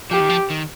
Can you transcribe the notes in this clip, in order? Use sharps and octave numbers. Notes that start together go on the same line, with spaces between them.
F3 G4
D#3
F3
D#3